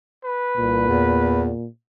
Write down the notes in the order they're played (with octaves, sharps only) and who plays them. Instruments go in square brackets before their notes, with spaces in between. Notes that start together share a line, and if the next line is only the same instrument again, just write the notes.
[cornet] B4
[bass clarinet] C2 [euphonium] A#2
[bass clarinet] E2